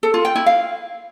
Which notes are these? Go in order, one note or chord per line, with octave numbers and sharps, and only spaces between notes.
A4
F4
G5
E4
F5